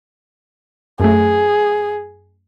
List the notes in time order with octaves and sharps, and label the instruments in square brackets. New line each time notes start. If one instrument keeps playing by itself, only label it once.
[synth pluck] F#2 A3 [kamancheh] G#4